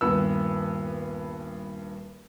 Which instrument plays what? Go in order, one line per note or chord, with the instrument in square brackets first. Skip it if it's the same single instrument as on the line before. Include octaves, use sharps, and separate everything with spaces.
[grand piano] D#1 G2 B3 E6